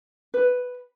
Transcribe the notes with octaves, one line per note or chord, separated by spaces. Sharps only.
B4